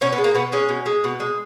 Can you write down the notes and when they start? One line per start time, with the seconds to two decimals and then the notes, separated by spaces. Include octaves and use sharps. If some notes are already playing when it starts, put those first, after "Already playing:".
0.01 B2 C#4
0.13 B3
0.18 G#3
0.24 A#3
0.35 B2 B3
0.52 G#3 C#4
0.69 B2
0.86 G#3
1.04 B2
1.20 G#3